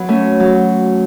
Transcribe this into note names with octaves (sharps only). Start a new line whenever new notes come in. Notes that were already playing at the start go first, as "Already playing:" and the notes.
Already playing: F#3 B3
A3 C#4
F#3